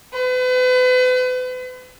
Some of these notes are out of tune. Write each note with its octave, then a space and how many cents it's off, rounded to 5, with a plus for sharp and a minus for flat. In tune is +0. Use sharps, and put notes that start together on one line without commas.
B4 +40